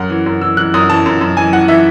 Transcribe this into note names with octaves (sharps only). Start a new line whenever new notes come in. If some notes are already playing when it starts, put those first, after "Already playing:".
Already playing: F#2 F#5
E3
F#2
E3 E6
E3 F#6
F#2 D#6
E3 A5
F#2
F#2
E3 G#5
E3 F#5
E3 E5